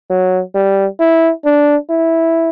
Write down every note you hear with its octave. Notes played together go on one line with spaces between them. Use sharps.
F#3
G3
E4
D4
E4